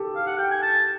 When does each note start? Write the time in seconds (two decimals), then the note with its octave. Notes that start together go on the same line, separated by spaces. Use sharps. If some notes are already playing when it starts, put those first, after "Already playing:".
Already playing: G4 A4
0.16 F5
0.27 F#5
0.38 G5
0.51 G#5
0.62 A5